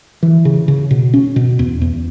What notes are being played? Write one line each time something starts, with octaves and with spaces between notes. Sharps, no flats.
E3
C#3
C#3
B2
C#4
B2
E2
E2